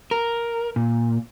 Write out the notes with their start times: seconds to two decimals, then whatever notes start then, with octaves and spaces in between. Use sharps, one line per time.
0.11 A#4
0.76 A#2